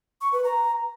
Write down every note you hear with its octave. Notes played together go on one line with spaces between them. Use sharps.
C#6
B4
A#5